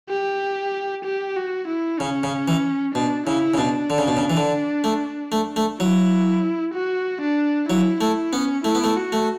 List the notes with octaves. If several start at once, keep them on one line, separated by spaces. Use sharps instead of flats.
G4
G4
F#4
E4
C#3 C#4
C#3
E3
B2 D4
C#3 E4
C#3
B2 D4
D3
C#3
B2
C#3
E3
D3
A3
A3
A3
F#3 E4
F#4
D4
F#3 E4
A3 E4
B3 C#4
A3 E4
B3
A3
F#4
A3